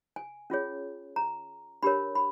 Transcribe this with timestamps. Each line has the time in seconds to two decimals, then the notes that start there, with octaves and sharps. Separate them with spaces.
0.16 G#5
0.50 C#4 F4 G#4 C#5
1.16 A#5
1.83 D4 G4 A#4 C#5 B5
2.15 B5